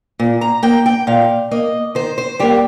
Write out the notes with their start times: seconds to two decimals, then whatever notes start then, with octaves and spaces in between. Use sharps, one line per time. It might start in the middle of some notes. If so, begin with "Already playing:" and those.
0.19 A#2
0.41 A#5
0.63 A#3 G5
0.86 G5
1.07 A#2 F5
1.51 A#3 D#5
1.95 D#3 C5
2.18 C5
2.39 G3 A#3 G4